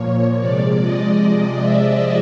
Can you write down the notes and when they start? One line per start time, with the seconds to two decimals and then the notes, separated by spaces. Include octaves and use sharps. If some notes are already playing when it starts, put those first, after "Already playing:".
Already playing: A#2 F3 A#3 C#5
0.39 C3 F3 G#3 D5
0.80 D#5
1.21 D5
1.61 E5